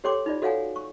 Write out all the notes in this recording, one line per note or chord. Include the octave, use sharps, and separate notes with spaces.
G4 A4 C#5 G5 C6 D6
D#4 F4 D5
F#4 A4 C#5 F5 F#5 G#5
C#6